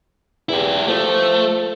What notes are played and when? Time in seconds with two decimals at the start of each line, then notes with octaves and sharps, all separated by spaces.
0.49 E2 E4 G4
0.88 F3 A3